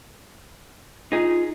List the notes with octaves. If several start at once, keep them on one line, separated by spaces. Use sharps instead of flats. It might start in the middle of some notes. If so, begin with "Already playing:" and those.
D#4 F4 G#4